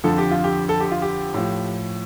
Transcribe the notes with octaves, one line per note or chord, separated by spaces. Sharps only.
F2 D3 F3 A4
G4
F4
G4
A4
G4
F4
G4
A2 F3